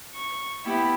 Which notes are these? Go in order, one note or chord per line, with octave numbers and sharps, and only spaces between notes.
C#6
B3 E4 G4